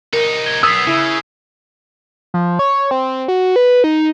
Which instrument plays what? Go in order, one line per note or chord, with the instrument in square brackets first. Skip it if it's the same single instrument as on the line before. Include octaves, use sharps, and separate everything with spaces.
[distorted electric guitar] C2 D#4 [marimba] A#4
[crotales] G#6 G7
[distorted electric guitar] B1 B3 [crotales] D#6 B6 C7 [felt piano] E6
[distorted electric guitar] C#3 [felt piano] E4
[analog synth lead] F3
C#5
C4
F#4
B4
D#4